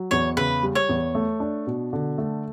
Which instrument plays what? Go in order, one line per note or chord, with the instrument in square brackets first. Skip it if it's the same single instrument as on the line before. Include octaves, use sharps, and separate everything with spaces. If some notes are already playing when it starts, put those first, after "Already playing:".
Already playing: [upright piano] F#3
[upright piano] E2 [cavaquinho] C#5
[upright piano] C#3 [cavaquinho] B4
[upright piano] G3
[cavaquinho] C#5
[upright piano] E2
A3
D4
B2
D3
A3